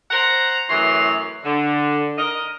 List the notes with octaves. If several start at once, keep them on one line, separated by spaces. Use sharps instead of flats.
C5 F#5 A#5
F#2 A2 E3 C#5 C6
D3
A#4 D#5